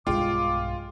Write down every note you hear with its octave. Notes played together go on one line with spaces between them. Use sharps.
B1 G2 G#3 F4 F5 G5 D6